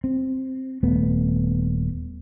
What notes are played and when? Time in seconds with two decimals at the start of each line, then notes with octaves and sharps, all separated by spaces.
0.04 C4
0.83 D#1 A3 B3